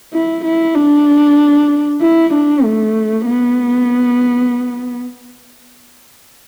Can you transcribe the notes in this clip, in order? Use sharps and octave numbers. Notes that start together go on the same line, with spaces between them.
E4
E4
D4
E4
D4
A3
B3